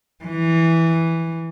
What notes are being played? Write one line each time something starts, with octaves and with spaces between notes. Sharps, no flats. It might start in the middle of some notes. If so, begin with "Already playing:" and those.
E3